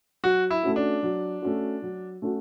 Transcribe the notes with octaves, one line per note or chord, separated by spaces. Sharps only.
F#3 F#4
E4
A3 C#4 F#4
D4
F#3
A3 C#4 F#4
F#3
A3 C#4 F#4